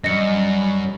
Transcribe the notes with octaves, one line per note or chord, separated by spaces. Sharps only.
F#2 G3 D#5 C#7